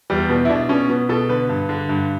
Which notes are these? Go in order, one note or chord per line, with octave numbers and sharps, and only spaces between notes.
E2 G3
B2 B3
E4
B2 D4
B2 C#4
B2 B3
B2 A4
D3 B4
G2
D3
G2